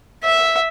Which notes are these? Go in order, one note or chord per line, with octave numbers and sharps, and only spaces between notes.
E5